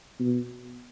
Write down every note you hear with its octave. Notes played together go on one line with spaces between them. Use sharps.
B2